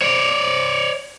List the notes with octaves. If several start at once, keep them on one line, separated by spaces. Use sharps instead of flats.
C#5 D5